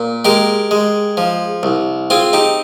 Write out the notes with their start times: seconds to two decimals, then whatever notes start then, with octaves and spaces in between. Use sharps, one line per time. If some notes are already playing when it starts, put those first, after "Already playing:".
Already playing: A#2
0.25 G#3 G4 A#4
0.71 G#3
1.17 F3
1.63 C2
2.10 C4 F4 G#4
2.33 D#4 G4